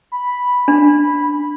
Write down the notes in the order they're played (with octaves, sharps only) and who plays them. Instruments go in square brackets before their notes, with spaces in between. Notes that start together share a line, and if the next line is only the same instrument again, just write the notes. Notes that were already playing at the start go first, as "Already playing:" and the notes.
[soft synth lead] B5
[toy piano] D4